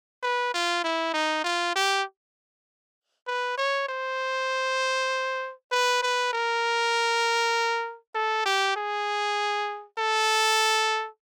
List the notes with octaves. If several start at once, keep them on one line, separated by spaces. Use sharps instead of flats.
B4
F4
E4
D#4
F4
G4
B4
C#5
C5
B4
B4
A#4
A4
G4
G#4
A4